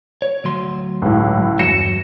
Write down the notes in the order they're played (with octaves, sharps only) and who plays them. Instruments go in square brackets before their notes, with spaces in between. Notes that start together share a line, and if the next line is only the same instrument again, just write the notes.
[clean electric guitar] C#5
D2 F#3 C6
[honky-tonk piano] C#2 A2
[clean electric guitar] E2 G2 F#3 [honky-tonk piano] A#6 C#7 E7